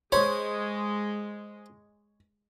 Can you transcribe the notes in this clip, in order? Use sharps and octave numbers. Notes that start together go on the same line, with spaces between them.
G#3 C5 C#5 B5